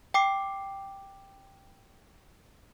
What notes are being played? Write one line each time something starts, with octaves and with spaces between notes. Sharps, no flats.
G5 D6 C7